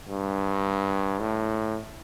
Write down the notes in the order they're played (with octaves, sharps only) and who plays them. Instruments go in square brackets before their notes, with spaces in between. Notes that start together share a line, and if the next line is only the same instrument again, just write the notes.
[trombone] G2
A2